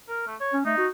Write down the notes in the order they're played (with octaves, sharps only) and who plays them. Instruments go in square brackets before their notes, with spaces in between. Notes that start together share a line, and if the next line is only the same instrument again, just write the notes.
[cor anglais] A#4
A3
C#5
[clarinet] C#4
[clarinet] A3 [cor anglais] D#4
[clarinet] F#4